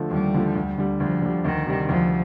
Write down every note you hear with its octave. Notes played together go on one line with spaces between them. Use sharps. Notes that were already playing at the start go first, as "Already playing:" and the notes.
Already playing: D3 F3 A3
D#2 G3
D3 F3 A3
D2
D3 G3
D2 F3
D3 G3
D2 D#3
C3 G3
D2 F3